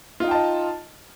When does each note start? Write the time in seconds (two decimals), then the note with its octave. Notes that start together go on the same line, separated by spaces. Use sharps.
0.20 F4
0.24 D#4
0.28 G5
0.31 A5
0.35 D#5